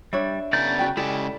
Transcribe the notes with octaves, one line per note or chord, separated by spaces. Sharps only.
G3 D4 C#5 E5
C#3 B3 A#4 D5 G6
F#4 G5
C#3 G#3 E4 G4 A4 D5